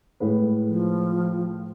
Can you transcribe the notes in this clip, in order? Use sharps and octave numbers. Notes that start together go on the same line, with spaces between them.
A2 G#3 B4
F3